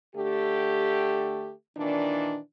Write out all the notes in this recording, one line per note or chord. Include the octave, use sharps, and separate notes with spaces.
D3 A3 G4
A#2 D#3 E3 D4